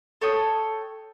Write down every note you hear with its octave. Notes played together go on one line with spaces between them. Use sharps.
A4 C#5 G5 D#6